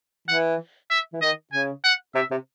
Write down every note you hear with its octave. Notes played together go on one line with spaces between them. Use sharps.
E3 F#5
E5
E3
D#3 D#5
C#3 G#5
F#5
C3 E5
C3